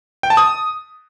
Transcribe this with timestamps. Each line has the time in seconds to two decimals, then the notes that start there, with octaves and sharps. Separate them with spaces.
0.23 G5
0.30 A5
0.37 D#6